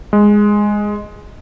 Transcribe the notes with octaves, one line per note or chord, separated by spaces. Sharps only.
G#3